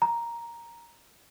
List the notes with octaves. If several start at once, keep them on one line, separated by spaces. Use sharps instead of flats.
A#5